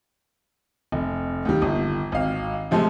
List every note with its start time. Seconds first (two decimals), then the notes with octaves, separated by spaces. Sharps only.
0.92 F1
1.45 D#2 G3
1.62 G1
2.12 G#1 F5
2.71 C3 F3 G#3 A3